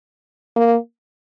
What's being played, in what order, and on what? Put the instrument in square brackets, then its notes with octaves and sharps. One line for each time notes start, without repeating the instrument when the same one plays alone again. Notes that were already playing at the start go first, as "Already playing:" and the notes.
[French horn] A#3